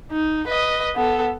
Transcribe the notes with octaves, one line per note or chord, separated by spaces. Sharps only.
D#4
B4 D#5
B3 A4